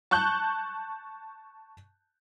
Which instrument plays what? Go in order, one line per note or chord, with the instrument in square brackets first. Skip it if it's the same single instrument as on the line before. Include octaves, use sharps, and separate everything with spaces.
[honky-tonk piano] A5 C#6 F#6 G6